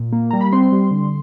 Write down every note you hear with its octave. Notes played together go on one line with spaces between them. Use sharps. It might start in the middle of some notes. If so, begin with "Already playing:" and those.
Already playing: A#2
A#3
G3 A#5
B5
C4 C6
G3
D3